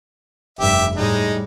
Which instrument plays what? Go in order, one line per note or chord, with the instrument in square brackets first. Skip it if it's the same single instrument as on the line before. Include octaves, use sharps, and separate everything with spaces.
[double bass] F1 G2 [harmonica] G4 E5
[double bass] A2 G3 [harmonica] G#3 D#4